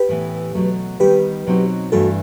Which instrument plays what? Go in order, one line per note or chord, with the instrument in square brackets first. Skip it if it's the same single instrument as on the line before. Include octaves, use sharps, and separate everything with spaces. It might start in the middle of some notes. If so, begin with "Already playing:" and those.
Already playing: [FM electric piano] G4 B4
[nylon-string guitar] A2 E3 B3
B2 F#3 A3
[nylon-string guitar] D#3 G3 B3 D#4 [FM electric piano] G4 B4
[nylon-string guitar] B2 F#3 C4 D#4
[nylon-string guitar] G2 E3 A3 [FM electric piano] F#4 A4